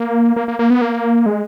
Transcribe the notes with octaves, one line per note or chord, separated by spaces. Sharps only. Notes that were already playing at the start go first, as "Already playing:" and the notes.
Already playing: A#3
A#3
A#3
A#3
B3
A#3
G#3